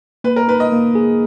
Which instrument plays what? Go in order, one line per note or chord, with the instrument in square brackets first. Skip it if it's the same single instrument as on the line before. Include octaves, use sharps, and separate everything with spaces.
[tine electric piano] A#3 [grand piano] B4
[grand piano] A#4
[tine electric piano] D#4 [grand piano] B4
[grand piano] D#5
[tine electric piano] A#3
G#4